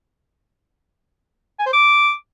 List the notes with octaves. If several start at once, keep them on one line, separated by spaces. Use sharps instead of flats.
G#5
C5
D6